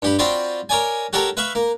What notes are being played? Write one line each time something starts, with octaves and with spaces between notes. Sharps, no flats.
G2 G4 B5
C4 F4 F#4 C5 D5 B5
A#4 C#5 D5 G#5
F#4 G4 A4 A#4 C#5 A5
B4 E5 F5 B5 C#6
A#3